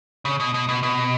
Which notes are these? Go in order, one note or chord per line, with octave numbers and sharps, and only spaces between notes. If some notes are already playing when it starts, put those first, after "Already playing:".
C#3
B2
B2
B2
B2